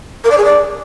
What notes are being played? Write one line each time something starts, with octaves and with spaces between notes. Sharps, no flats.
A#4
D5
G#4
D5